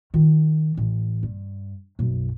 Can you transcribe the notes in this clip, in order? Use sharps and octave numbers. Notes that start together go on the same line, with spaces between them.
D#3 F4
A1
G2
B1 F#2